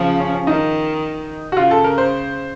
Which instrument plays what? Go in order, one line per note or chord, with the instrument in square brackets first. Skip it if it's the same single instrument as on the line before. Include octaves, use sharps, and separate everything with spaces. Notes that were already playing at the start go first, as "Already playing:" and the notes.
Already playing: [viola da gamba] C#3 F3
[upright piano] C#4
C#4
[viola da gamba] D#3 [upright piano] D#4
[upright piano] F#4
[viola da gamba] C#3 [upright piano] F4
[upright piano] A4
A#4
C5